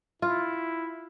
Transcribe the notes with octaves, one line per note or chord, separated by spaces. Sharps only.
E4 F4